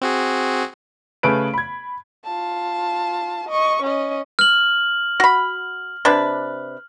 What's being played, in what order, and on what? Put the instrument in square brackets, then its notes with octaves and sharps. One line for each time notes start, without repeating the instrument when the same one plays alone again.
[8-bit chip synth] C4 F#4 G#4
[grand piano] C#3 A3 G#4 B4 D7
B5 G#6
[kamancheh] F4 A5
D#5 C#6
C#4 D#5
[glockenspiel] F6 F#7
[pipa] F#4 B5
C3 D4 B4